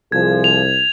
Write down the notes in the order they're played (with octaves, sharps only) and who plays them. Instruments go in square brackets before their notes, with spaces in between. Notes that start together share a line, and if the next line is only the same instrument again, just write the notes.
[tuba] C2 [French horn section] F3 G#4 [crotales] G#6
[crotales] F7